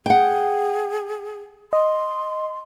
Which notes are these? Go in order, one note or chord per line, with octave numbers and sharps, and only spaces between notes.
G#4 F#5 G5
D#5 C6